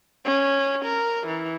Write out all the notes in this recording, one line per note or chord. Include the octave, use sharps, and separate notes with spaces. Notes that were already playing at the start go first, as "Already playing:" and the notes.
C#4
A#4
E3